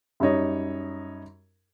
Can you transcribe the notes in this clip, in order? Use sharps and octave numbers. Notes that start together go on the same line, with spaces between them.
F#2 G3 D#4 C#5 D#5